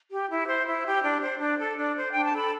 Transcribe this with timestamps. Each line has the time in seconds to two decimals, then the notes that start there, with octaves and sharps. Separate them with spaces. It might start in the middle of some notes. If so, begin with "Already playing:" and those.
0.12 G4
0.30 E4
0.48 C5
0.67 E4
0.85 G4
1.04 D4
1.21 C5
1.40 D4
1.59 A4
1.78 D4
1.96 C5
2.12 D4 G5
2.25 A5
2.33 A4 B5